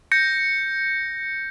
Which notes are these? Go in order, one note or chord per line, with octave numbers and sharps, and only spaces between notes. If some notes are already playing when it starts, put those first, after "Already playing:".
G6 A#6 C#7